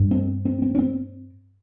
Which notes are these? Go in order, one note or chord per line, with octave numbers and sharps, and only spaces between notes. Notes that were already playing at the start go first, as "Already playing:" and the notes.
Already playing: G2
C4
C4
C4
C#4
C4